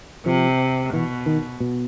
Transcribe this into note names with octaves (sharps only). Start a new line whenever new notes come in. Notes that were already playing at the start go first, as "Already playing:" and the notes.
C3 F3
B2 E3
D#3
B2